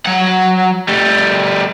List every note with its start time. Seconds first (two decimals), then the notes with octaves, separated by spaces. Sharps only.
0.06 F#3 F#5
0.88 G3 A3